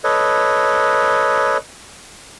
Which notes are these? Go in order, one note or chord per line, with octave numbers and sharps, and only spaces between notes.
A4 B4 C#5 D#5